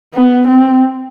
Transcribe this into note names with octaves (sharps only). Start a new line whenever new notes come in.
B3
C4